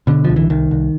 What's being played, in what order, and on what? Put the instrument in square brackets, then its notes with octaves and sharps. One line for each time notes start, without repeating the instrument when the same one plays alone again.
[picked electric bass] B2 D3
C2 F3
E3
C2 D#3
C2